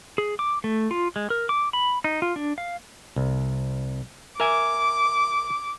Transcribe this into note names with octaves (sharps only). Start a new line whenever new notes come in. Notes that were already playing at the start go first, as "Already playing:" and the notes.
G#4
D6
A3
F4
G#3
A#4
D6
B5
D#4
F4
D4
F5
C2
A#4 E5 G#5 D6